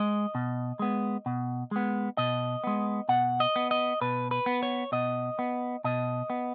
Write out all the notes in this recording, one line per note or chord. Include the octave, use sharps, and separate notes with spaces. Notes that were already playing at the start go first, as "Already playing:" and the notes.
Already playing: G#3 D#5
B2
G#3 B3
B2
G#3 B3
B2 D#5
G#3 B3
B2 F#5
D#5
B3
D#5
B2 B4
B4
B3
C#5
B2 D#5
B3
B2 D#5
B3